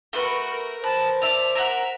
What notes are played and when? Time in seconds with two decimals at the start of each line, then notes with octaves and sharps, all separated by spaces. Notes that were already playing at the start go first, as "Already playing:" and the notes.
0.13 A3 F#4 A#4 B4
0.49 A#4
0.84 B4 C5 A5
1.22 D5 E5 A5 F7
1.55 A#4 E5 F#5